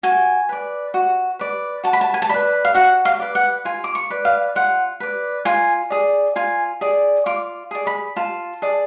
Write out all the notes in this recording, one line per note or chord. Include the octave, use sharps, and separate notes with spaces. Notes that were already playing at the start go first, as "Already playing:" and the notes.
F#4 G#5
B4 D5
F#4
B4 D5
F#4 A5
B5
A5
G#5
A5
B4 D5 B5
F5
F#4 F#5
F5
B4 D5
F#5
F4 G#5
D6
C#6
B4 D5
F5
F4 F#5
B4 D5
F4 G#5
G#4 D5
F4 G#5
G#4 D5
F4 D6
G#4 D5
B5
F4 A5
G#4 D5